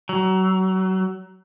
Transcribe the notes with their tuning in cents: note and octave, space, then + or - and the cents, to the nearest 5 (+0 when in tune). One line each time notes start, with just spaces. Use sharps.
F#3 +30